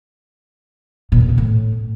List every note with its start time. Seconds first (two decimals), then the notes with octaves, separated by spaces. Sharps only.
1.12 A#2
1.20 F2
1.29 C#3
1.38 A2